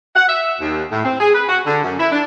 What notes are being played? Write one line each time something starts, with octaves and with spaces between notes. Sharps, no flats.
F#5
E5
D#2
A2
C4
G#4
B4
F#4
D3
F#2
E4
D4